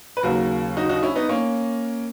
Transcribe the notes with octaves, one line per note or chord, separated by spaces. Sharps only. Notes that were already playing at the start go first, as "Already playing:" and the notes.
B4
D#2 C#3 F#3 F#4 A#4
D#4 F#4
D#4 F#4
C#4 E4
B3 D#4
A#3 C#4